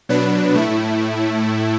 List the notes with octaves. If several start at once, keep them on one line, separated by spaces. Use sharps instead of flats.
B2 F#3 D4 B4
A2 A3 E4